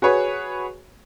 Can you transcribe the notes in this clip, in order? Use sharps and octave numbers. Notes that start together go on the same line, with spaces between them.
F#4 G#4 B4 C#5